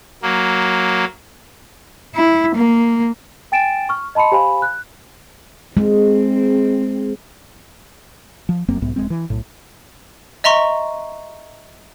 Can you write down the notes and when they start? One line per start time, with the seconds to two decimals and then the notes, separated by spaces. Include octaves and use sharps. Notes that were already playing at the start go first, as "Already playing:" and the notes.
0.23 F#3 A#3
2.15 E4
2.55 A#3
3.52 G5 G#5 A6 D7 E7
3.89 C#6 F6
4.15 D#5 A5 B5 C6 C#7
4.32 G4 C5 F5 G#5 B5
4.62 F#6
5.77 G#3 C4
8.49 F3
8.68 F1 F#2 A#3 C4
8.82 B1 G#2 B3
8.96 E1 C#2 G#3 C4
9.10 E3
9.30 B1 A2
10.44 D#5 E5 A#5 C6 C#6